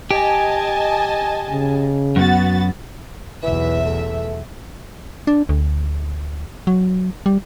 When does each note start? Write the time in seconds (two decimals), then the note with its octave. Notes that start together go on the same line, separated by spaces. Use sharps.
0.11 G4 D#5 G#5 A5
1.50 C#3
2.16 F#2 B3 F#4 A6
3.43 B1 E2 E3 E5
3.86 A3
5.27 D4
5.49 D2
6.67 F#3
7.26 G3